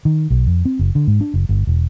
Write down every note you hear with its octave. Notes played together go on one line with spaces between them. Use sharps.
D#3
B1
F2
C4
F#1
D3
G#2
D4
F#1
G1
E1